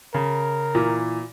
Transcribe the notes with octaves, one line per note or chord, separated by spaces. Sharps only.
C#3 A#4
A#2 E3